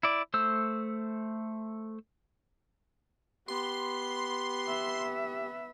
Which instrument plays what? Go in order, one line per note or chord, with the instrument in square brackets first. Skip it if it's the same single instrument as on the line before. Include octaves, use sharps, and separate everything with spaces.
[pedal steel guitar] E4 D5
A3 C5 E6
[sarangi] B3 [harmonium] G4 [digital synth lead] C6
[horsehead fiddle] E5